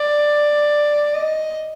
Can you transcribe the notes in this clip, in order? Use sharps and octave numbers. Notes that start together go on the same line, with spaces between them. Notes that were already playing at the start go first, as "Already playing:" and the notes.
Already playing: D5
D#5